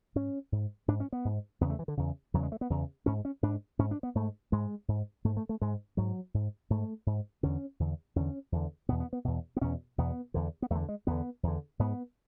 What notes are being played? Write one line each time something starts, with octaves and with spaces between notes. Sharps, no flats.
G#2 C#4
G#2
G#2 D4
C#4
B3
G#2
E2 C#3 B3
A3
E3
D3
E2 C#3
E2 C#3 F#3
G#3
A3
B3
E2 C#3
G#2 C#4
C#4
G#2 D4
G#2 C#4
D4
B3
G#2 A3
G#2 G#3
G#2
G#2 A3
A3
A3
G#2 G#3
G#2 F#3
G#2
G#2 A3
G#2
E2 D3 C#4
E2 D3
E2 D3 C#4
E2 D3
E2 B2 B3
B3
B3
E2 B2
B3
E2 B2 C#4
E2 B2 B3
E2 D3
B3
E2 D3 A3
G#3
E2 D3 B3
E2 D3
G#2 B3